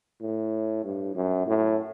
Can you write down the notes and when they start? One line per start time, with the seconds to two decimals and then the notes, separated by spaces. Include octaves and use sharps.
0.21 A2
0.84 G2
1.15 F#2
1.47 A2